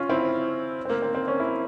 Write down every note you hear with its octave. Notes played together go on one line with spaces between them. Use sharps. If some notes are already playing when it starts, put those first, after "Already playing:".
Already playing: C#4 F4
C4 E4
C4
A#3
C4
C4
C#4
E4